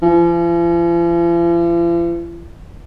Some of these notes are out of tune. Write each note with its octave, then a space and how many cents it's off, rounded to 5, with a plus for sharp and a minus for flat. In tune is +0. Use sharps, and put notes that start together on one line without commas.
F3 -45